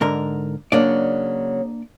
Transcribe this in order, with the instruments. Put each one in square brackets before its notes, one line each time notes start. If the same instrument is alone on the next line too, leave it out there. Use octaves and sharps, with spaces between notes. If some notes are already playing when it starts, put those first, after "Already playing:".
[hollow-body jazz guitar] G#2 D3 A#4
[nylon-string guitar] C#3 F#3 [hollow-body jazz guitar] A#3 D4 D5